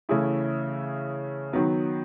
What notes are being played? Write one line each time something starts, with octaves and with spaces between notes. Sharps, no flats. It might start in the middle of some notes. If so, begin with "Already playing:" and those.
C#3 E3 A3 E4 G#4
D#3 F#3 B3